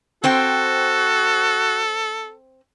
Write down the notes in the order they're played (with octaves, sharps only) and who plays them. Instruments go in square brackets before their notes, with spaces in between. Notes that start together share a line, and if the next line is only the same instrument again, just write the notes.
[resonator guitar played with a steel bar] C4 C5 G5 [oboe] F#4 [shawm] A4